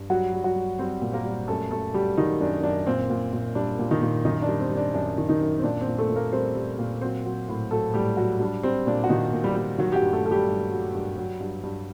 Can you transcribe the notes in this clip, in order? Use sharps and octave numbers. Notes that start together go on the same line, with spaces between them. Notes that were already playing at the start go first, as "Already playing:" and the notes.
Already playing: G2
F#3 G3 F#4
G3
F#3 F#4
G3
G3 C4 C5
A#2
A#3 A#4
G3
F#2 A3 A4
F#2 A3 A4
F#3 G3 G4
D#3 F#3 D#4
F#2 D4
F#2 D4
A#2 C4
A#2
A#2
G3 D4
A#2
D#3 D#4
A#2
F#2 D#3 D#4
D4
G3
C4
G3
D4
F#2 D4
D#3
D#3 D#4
F#2
C4
A#2 D4
C4
A#2
A3 A4
A#2
A#3 A#4
G3 C4 C5
G3
A#2
F#3 C4 C5
F#3
A2
F#3 A3 A4
A2 G3 G4
F#3 F#4
G3 D4
G3 C4
A#2 D4
F#4
A#2 D#3 D#4
A#2
G3 G4
G3
D#3 F#3 F#4
G4
F#3 F#4
G2
A3 A4
F#3 A4
G3 G4
G2
F#3
G2
F#3
G2
G2